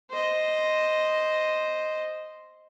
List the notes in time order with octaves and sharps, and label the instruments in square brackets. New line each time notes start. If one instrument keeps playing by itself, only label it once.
[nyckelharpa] C5 D#5